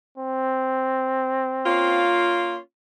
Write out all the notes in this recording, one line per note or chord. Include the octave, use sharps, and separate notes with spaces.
C4
A#3 C#4 F4